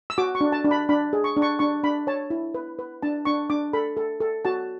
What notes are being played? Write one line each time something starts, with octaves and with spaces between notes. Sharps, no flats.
E6
F#4 D6
C#6
D4
A5
D4
B5
D4 B5
G#4
C#6
D4
C#6
D4 C#6
D4 B5
C#5 A5
E4
B4
B4
D4 A5
D4 C#6
D4 D6
A4 B5
A4
A4
F#4 A5